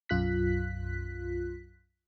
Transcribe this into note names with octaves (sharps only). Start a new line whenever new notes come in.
B1 F#2 F4 F#6 B6